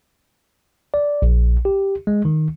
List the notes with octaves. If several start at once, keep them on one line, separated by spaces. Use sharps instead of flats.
D5
A#1
G4
G#3
D#3